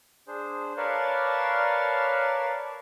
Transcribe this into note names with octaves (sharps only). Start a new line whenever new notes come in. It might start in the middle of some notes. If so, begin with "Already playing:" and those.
D4 G#4 C5
A#4 B4 C#5 D5 F5 A5